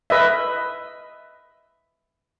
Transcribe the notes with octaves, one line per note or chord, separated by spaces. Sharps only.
B4 D#5 E5